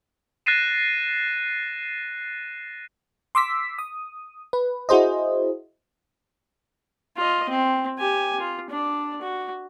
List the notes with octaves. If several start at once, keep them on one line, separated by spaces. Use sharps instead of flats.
F#6 A6 A#6 C7 D#7 E7
C6 D6 E6 B6
D#6
B4
E4 F#4 G#4 C5 D#5
F4 D#5
C4
G4 G#5
F4
D4 D5
F#4